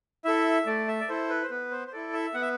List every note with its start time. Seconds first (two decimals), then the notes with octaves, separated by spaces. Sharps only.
0.24 E4 A4 E5
0.66 A3 D5
0.88 E5
1.01 D5
1.08 E4 A4 C5
1.29 B4
1.43 C5
1.50 B3 B4
1.72 C5
1.87 C5
1.93 E4 A4 D5
2.13 E5
2.34 B3 F#5
2.42 E5